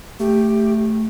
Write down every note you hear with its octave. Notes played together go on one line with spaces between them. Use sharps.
A3 G4